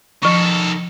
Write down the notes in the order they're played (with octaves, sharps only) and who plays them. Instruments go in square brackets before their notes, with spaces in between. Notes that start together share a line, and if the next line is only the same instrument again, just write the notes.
[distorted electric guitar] D#3 A4 [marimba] F3 C#6